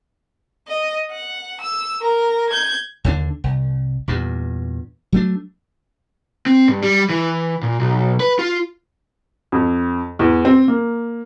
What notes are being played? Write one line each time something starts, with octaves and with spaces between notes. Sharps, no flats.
D#5
F#5
E6
A#4 A#5
G6 G#6
D#2 D3 F#3 D4
C2
E2 G2 A#2
F#3 A3 D4
C4
G2
G3
E3
A#2
B1
B4
F4
F2
E2
C4
A#3